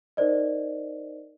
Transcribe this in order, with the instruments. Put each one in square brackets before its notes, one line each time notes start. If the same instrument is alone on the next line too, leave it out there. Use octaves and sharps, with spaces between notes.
[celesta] D#4 A#4 C5 D5 D#5